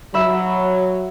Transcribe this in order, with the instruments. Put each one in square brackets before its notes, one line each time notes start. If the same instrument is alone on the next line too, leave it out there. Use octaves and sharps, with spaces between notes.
[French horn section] F#3 [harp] E5 B5